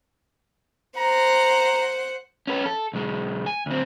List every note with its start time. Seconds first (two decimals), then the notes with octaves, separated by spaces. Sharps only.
0.98 C5 F#5 A#5
2.47 C#4 B4
2.66 A4
2.94 B1 G#3
3.46 G#5
3.66 D2 C4